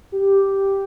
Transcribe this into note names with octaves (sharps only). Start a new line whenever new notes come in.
G4